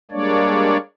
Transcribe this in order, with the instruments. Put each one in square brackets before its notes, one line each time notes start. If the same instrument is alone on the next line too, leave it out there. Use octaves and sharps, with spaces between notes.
[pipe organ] G3 G#3 A#3 D4 C#5 D5